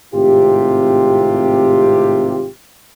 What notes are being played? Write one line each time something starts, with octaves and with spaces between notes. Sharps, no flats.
G#1 A2 C3 F4 G4